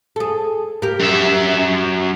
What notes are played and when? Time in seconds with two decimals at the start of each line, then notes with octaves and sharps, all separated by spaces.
0.16 G#4 A4
0.82 G4 A#4
1.00 F#2 E5